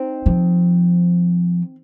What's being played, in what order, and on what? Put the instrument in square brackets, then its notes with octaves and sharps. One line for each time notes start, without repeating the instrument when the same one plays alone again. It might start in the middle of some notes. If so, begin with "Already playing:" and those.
Already playing: [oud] C4 D#4
[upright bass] F3